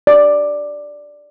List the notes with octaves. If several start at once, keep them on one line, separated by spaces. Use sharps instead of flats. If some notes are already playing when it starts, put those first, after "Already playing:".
D5